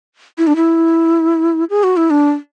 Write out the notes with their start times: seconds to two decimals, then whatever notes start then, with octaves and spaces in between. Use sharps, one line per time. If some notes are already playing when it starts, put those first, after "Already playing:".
0.38 E4
0.47 D4
0.56 E4
1.70 G#4
1.84 F#4
1.97 E4
2.10 D4